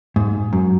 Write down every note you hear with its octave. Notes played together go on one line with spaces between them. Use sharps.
G#2
F#2